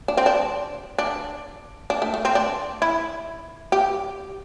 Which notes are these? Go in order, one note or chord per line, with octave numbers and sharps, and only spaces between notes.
D4
C4
D4
D4
D4
A3
A3
C4
D4
E4
G4